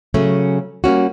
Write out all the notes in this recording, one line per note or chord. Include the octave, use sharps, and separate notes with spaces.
C#3 F#3 A3 C#4
G3 A#3 C#4 F#4